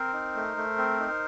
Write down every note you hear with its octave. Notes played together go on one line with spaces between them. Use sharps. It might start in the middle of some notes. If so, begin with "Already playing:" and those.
Already playing: C4 A#4 C5
D#4
A3
A3
C4
D#4